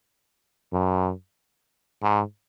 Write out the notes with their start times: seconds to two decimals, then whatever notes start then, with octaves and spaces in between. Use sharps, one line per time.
0.73 F#2
2.02 G#2